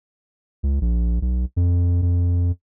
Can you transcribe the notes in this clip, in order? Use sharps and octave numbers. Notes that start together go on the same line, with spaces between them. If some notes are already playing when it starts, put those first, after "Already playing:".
C#2
A#1
B1
F2
F2